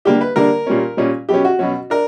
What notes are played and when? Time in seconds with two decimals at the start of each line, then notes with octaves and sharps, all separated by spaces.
0.05 D3 G3 A#3 D4 G4
0.21 B4
0.36 D3 G3 A#3 D4 A#4
0.66 A#2 G3 C#4
0.97 A#2 G3 C#4
1.29 B2 F#3 C#4 G4
1.45 F#4
1.59 B2 F#3 C#4
1.90 D4 A#4